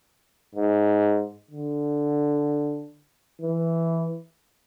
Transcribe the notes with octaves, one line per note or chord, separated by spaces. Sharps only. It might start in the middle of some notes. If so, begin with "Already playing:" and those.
G#2
D3
E3